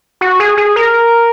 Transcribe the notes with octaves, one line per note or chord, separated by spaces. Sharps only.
F#4
G#4
G#4
A#4